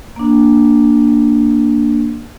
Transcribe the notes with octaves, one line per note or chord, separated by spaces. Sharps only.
A#3 D4